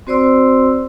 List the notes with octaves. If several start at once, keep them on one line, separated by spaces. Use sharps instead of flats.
C4 F#4 C5 D5 C6 E6